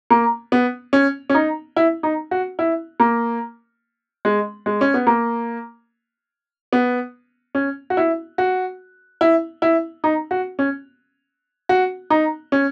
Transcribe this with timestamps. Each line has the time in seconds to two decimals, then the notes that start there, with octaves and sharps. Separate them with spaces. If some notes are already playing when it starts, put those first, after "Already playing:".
0.10 A#3
0.52 B3
0.93 C#4
1.30 C#4
1.34 D#4
1.77 E4
2.03 D#4
2.31 F#4
2.59 E4
3.00 A#3
4.25 G#3
4.66 G#3
4.81 C#4
4.94 B3
5.07 A#3
6.73 B3
7.55 C#4
7.90 F#4
7.97 E4
8.38 F#4
9.21 E4
9.62 E4
10.04 D#4
10.31 F#4
10.59 C#4
11.69 F#4
12.10 D#4
12.52 C#4